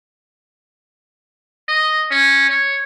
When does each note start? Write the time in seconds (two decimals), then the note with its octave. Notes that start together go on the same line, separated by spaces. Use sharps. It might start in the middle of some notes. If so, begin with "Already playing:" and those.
1.69 D#5
2.11 C#4
2.50 C#5